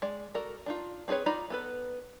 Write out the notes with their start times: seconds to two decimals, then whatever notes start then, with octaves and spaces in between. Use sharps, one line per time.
0.02 G#3 D5
0.34 F#4 A4 A#4 D5
0.66 D4 D#4 F4
1.08 C4 D4 G#4 B4 C#5
1.26 D#4 F4 D5 A#5 B5
1.50 B3 A4 B4